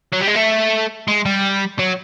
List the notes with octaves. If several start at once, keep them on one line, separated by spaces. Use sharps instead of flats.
F#3
G3
G#3
A3
G#3
G3
F#3